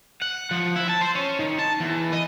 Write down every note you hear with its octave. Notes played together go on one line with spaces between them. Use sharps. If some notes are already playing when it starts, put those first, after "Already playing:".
F#5
F3
E4
A5
C5
C#4
D#3
A5
E2
D#5